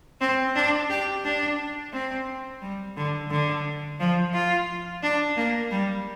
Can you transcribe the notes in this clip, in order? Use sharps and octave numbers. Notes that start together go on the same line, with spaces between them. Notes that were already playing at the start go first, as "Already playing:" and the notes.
C4
D4
G4
D4
C4
G3
D3
D3
F3
F4
D4
A#3
G3